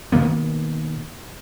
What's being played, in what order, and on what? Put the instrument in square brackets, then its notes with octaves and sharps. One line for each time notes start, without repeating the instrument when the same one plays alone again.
[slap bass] B2 D#3 A#3 B3